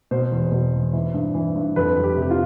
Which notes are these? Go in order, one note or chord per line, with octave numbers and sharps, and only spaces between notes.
B2 C5
E2
B2
E2
E3
G2
E3
G2
F2 B4
F2
G4
C3
G4
F4